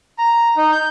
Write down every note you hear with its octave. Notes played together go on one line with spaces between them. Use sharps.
A#5
D#4
G6